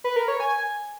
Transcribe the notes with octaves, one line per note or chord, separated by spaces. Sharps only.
B4
A#4
C#5
G#5